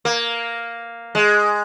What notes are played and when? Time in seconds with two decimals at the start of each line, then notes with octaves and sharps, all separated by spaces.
0.05 A#3
1.15 G#3